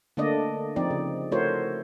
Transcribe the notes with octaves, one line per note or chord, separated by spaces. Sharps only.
D3 A3 A#3 D4 D5 D#5
F3 C4 D#4 D5
C#3
A3 E4 F#4 A#4 C5 C#5